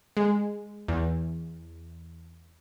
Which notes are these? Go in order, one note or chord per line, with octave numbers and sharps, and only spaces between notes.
G#3
E2